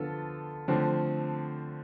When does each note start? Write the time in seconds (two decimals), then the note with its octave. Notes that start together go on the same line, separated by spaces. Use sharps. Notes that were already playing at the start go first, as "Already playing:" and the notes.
Already playing: D3 F3 B3 F4 A4
0.68 D3 F3 A3 C4